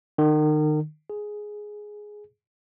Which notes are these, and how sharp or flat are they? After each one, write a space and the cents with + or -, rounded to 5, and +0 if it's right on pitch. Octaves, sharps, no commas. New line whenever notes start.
D#3 -35
G#4 +5